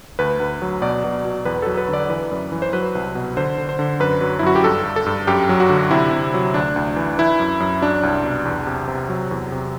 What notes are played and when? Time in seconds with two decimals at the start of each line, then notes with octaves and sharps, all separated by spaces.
0.19 D2 B4
0.40 D2
0.62 F#3
0.82 B2 D5
1.04 B2
1.25 B2
1.45 E2 B4
1.62 F#3 A4
1.77 B4
1.88 D3
1.93 D5
2.09 E3 B4
2.31 F#2
2.52 E3
2.62 C5
2.73 F#3 B4
2.95 C2
3.15 B2
3.37 D3 C5
3.58 D3
3.69 C5
3.79 D3
4.00 F#2 B4
4.21 F#3
4.39 E4
4.43 F#2 F#4
4.55 G4
4.64 G2 A4
4.85 G2
4.96 A4
5.06 G2
5.27 F#2 G4
5.49 F#3
5.60 F#4
5.69 D3
5.91 C3 E4
6.12 C3
6.34 F#3
6.54 D2 D4
6.76 D2
6.97 E3
7.18 E3 E4
7.40 F#2
7.60 F#2
7.82 F#3 D4
8.03 C2
8.24 B2
8.45 E2
8.67 C3
8.88 C3
9.09 F#3
9.31 E2
9.52 C3